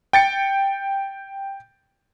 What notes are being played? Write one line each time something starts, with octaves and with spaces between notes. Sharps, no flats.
G5 A6 C#7